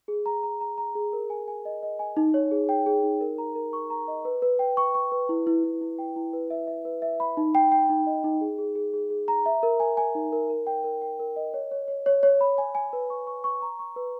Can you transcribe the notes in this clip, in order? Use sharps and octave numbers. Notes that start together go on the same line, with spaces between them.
G#4
A#5
A#5
A#5
A#5
G#4
A#4
G#5
G#5
D#5
D#5
G#5
D#4
C#5
G#4
G5
G#4
D#4
A#4
A#5
A#4
C#6
A#5
D#5
B4
B4
G5
C#6
C#6
B4
E4
E4
E4
E4
G5
E4
B4
E5
E5
B4
E5
B5
D#4
G5
G5
D#4
D#5
D#4
G#4
G#4
G#4
G#4
G#4
A#5
E5
A#4
G#5
G#5
D#4
A#4
A#4
G5
A#4
G5
A#4
D#5
C#5
C#5
C#5
C#5
C#5
B5
G#5
G#5
B4
C#6
C#6
C#6
A#5
C#6
B4